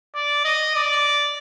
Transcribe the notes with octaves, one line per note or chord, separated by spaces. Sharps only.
D5
D#5
D5